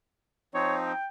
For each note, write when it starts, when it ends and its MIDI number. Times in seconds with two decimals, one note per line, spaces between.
0.54 0.93 53
0.54 0.93 60
0.54 0.93 63
0.54 0.76 73
0.85 1.08 79